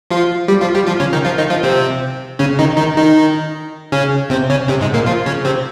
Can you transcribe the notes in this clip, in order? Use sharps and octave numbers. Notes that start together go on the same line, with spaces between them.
F3 F4
G3 G4
F3 F4
G3 G4
F3 F4
C#3 C#4
D#3 D#4
F3 F4
D#3 D#4
F3 F4
C3 C4
C#3 C#4
D#3 D#4
D#3 D#4
D#3 D#4
C#3 C#4
C3 C4
C#3 C#4
C3 C4
G#2 G#3
A#2 A#3
F3 F4
C#3 C#4
C3 C4